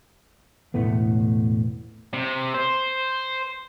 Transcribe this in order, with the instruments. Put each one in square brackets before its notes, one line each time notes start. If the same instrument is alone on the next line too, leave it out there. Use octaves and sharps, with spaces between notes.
[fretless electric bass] E1 A2 A3 B3
[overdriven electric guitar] C3
C5